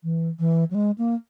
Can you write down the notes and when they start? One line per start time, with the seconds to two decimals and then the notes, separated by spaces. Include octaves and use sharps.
0.04 E3
0.39 E3
0.71 F#3
0.75 G#3
0.98 A#3